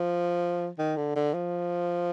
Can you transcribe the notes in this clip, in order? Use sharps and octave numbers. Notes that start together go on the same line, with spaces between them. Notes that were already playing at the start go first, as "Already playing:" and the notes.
Already playing: F3
D#3
D3
D3
F3